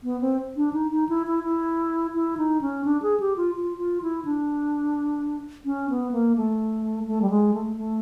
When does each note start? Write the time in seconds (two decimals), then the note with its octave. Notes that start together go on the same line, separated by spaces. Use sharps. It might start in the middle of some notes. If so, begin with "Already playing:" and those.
0.04 B3
0.21 C4
0.56 D4
0.73 D#4
0.91 D#4
1.09 E4
1.27 E4
1.44 E4
2.14 E4
2.37 D#4
2.61 C#4
2.85 D4
3.02 G#4
3.20 G4
3.37 F4
3.55 F4
3.78 F4
4.02 E4
4.25 D4
5.65 C#4
5.90 B3
6.12 A#3
6.36 A3
7.07 A3
7.22 G3
7.30 G#3
7.54 A3
7.77 A3